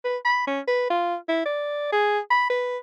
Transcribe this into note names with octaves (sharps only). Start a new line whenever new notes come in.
B4
B5
C#4
B4
F4
E4
D5
G#4
B5
B4